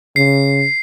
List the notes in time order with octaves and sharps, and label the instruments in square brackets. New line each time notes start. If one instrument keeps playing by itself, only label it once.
[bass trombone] C#3 [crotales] C7